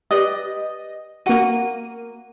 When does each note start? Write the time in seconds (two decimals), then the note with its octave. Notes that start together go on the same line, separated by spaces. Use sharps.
0.11 G4 B4 D5 D#5
1.26 A#3 F#4 F#5 D#7